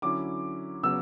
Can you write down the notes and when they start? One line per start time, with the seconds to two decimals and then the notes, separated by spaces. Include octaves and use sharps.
0.02 D3 F#3 C#4 E4 D6
0.83 C#3 F#3 B3 E6